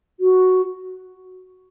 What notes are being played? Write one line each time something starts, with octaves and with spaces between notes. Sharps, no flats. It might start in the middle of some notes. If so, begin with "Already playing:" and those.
F#4